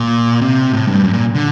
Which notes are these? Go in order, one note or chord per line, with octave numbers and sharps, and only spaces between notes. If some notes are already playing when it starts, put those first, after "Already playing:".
Already playing: A#2
C3
A2
G2
F#2
A#2
D3